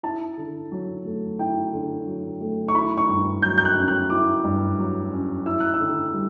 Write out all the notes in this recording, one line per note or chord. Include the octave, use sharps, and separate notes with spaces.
E4 A5
D3
F#3
A3
E4 G5
D3
F#3
A3
C#6
E4 B5
C#6
G2
F#3 G6
G6
F#6
C#4
F#6
E4 D6
G2
F#3
C#4
E4 E6
F#6
E6
D3
G3